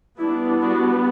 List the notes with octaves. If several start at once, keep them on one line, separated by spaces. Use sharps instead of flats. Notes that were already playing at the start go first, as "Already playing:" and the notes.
G3 B3 D4 E4
D4 F#4